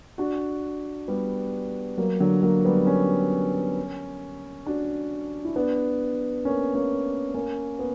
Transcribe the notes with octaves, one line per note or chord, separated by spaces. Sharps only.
D4 F#4
G3 B3
F#3 A#3
D3 F#3
F#3 A#3
G3 B3
A#3 C#4
D4 F#4
E4
B3 D4
A#3 C#4
A#3 C#4
A#3 C#4
B3